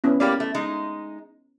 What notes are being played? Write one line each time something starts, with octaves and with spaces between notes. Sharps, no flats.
B3 C#4 E4
G3 A#3 G4 D5 B5
A3
G#3 D#4